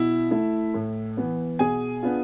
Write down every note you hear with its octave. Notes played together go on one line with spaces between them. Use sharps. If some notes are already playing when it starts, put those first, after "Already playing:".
Already playing: B2 E4 E5
A3 E4
A2
E3 B3
B2 G#4 G#5
B3 D4 F4